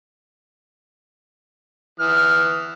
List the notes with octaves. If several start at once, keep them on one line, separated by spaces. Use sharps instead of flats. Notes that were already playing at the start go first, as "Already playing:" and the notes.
E3 D#6 F6